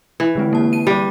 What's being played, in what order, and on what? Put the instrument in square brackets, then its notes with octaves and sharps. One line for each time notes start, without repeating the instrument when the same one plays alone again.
[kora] E3
[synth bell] D3 G#3 C4
A#3 A5
D#7
[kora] G3 [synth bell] G4 D5